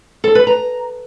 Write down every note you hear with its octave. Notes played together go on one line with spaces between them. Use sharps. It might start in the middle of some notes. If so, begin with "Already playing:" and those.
A4
B4
A#5